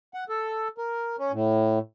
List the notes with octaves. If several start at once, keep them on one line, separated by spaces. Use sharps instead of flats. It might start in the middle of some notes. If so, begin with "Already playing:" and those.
F#5
A4
A#4
C#4
A2